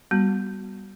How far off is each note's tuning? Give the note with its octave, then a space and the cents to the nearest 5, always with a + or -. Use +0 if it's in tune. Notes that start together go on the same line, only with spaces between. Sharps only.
G3 +0 B3 -20 F#4 +0